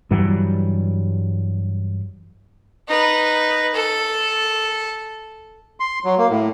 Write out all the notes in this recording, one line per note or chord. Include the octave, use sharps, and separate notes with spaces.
G2 E3 F#3 G3
D#4 B4
A4
C6
F#3
A#3
A2